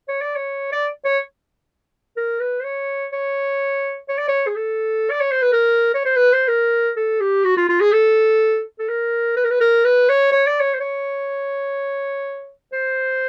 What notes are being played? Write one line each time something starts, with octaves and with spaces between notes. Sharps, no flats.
C#5
D5
C#5
D5
C#5
A#4
B4
C5
C#5
C#5
C#5
D5
C#5
G#4
A4
D5
C#5
C5
B4
A#4
C#5
C5
B4
C5
A#4
A4
G4
F#4
F4
F4
G#4
A4
A4
A#4
B4
A#4
B4
A#4
B4
C#5
C#5
D5
C#5
C5
C#5
C5